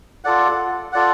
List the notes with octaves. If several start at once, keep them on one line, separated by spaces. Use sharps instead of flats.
F4 A4 D5 F#5
F4 A4 D5 F#5